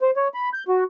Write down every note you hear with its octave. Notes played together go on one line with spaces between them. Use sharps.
C5
C#5
B5
G6
F#4